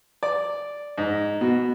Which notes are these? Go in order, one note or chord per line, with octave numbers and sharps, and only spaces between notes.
D5
G#2
B2